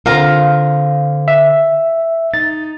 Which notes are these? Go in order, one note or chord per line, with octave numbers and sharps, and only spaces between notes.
D3 C4 F4 A#4 F5 A#5
E5
D#4 A6